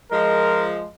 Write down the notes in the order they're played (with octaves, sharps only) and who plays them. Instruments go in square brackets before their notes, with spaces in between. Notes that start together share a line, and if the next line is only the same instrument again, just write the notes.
[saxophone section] F3 G#3 [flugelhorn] A#4